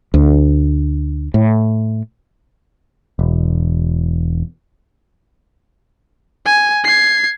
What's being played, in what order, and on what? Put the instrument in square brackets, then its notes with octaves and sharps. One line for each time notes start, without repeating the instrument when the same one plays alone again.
[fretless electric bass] D2
A2
[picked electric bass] E1
[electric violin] G#5
G#6 C7